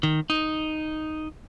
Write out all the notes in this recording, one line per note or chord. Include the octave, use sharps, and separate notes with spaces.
D#3
D#4